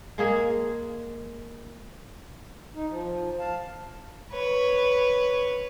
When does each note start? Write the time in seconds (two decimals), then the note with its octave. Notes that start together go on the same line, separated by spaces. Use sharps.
0.18 G#3 A#3 G#4
2.76 D#4
2.90 F3
3.39 F5 A5
4.32 B4 C#5